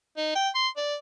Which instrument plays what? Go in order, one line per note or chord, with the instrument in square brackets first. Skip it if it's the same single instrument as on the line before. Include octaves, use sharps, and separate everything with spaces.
[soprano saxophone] D#4
G5
C6
D5